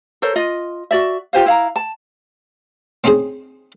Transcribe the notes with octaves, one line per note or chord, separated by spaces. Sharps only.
A4 A#4 C5 C#5
F4 D#5
F#4 D5 E5
F4 G4 C5 F5
E4 F5 A#5
A5
C4 C#4 D#4 G#4 C5